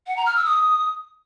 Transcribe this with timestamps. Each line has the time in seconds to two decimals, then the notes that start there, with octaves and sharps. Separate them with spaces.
0.07 F#5
0.17 A#5
0.26 F6
0.36 E6
0.45 D#6